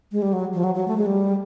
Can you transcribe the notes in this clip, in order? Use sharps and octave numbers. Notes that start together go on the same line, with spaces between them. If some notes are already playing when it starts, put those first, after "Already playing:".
G#3
G3
F#3
F3
F#3
F#3
A3
G#3
G3